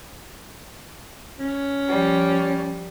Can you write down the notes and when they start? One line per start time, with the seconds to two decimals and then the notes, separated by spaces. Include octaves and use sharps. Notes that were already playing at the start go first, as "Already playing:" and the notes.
1.39 C#4
1.88 F3 G3